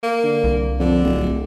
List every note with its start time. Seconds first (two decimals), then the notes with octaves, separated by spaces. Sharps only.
0.03 A#3
0.24 D3
0.44 C2
0.80 F2 D3
1.04 D1